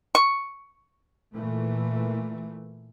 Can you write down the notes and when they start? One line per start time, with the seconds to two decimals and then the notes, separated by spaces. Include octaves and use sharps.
0.15 C#6
1.34 A#2 E3 A3